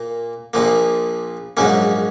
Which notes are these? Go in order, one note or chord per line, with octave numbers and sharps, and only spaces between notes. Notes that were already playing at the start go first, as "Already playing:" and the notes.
Already playing: A#2 A#3
A#1 A#2 F3 A#3
A#1 G#2 F#3 A#3 C#4